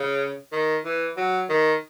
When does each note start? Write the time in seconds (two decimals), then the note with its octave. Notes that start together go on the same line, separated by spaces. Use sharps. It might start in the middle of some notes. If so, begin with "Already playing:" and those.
Already playing: C#3
0.53 D#3
0.85 E3
1.17 F#3
1.49 D#3